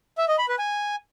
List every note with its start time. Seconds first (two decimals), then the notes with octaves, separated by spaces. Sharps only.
0.18 E5
0.28 D#5
0.38 B5
0.49 B4
0.59 G#5